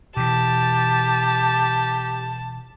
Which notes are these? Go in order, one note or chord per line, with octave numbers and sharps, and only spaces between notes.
B2 E3 G4 A5